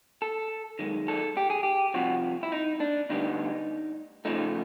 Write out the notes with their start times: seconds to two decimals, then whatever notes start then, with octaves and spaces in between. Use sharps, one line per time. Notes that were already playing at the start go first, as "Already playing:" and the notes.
0.22 A4
0.79 F#2 D#3 G#3
1.08 A4
1.37 G4
1.50 G#4
1.63 G4
1.94 C2 C3 F3 F#4
2.43 E4
2.52 D#4
2.80 D4
3.10 D2 D3 G3 B3 D#4
4.25 F2 C#3 F3 A3 D#4